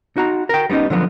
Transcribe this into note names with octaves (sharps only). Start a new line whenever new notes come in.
D#4 F#4 A#5
A#4 G5
G3 B3 C#4 D#4
D3 F3 F#3 B3